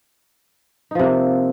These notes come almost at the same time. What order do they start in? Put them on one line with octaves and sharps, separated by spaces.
D#4 F3 C3 A#3